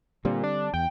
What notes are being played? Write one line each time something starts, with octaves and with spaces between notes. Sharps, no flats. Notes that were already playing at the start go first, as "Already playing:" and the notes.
A#2 D3 G3 C4
D4
E2 G5